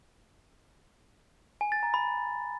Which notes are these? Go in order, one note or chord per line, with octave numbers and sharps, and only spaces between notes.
G#5
A6
A#5
B5